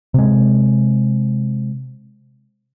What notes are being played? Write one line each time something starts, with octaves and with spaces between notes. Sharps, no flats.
C3 G#3